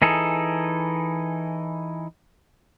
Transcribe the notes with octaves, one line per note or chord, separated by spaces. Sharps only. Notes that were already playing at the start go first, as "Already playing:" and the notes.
E3 D#4 G#4 A4